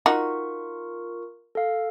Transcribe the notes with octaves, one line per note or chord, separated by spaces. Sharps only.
D#4 F4 F#4 A#4 C#6
A4 F5